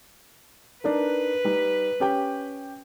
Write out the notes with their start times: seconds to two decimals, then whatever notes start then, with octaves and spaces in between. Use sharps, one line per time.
0.84 D4 D#4 A#4 B4
1.45 G3 D#4
2.00 C#4 G4 G5